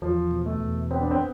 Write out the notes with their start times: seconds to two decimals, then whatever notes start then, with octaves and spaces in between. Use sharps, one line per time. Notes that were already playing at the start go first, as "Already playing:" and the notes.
0.02 E2 F3
0.31 B2
0.46 A3
0.60 E2
0.91 B3 C4
1.00 D4
1.11 C4